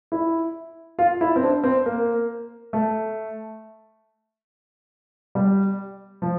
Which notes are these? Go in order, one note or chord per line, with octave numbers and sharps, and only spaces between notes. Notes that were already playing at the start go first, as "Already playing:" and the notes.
E4
F4
E4
C4
D4
C4
A#3
A3
G3
F3